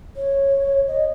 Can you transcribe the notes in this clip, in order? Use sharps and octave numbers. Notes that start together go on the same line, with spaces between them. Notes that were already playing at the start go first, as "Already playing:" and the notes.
C#5
D#5